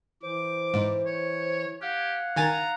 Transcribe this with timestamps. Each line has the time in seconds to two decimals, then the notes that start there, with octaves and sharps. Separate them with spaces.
0.23 E3 C5 D6
0.74 G#2
1.05 C#5
1.81 G4 F5 F#5 G#6
2.36 D#3 G#5 A#5 A6